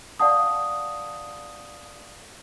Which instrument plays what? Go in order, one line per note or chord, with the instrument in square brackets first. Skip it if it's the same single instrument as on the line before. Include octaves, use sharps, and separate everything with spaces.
[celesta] D5 F5 F#5 A5 D#6